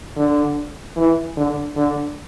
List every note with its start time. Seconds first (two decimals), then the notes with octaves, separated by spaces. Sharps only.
0.17 D3
0.96 E3
1.37 D3
1.76 D3